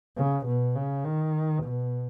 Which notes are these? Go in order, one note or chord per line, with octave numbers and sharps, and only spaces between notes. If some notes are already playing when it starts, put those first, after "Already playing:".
C#3
B2
C#3
D#3
B2